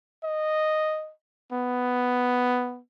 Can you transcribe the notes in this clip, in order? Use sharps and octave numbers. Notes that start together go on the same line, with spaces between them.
D#5
B3